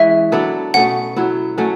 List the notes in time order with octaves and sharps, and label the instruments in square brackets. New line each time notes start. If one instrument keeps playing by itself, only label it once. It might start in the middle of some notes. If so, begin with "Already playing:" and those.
Already playing: [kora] E3 G#3 C#4 E4 [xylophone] E5
[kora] F#3 B3 D4 A4
[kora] B2 A3 C#4 [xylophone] F#5
[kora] F#3 B3 E4
F#3 A3 C#4